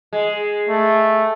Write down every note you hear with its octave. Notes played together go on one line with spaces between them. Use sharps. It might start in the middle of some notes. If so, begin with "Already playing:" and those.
G#3
A3